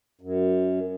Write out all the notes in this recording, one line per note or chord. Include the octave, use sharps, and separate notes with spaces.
F#2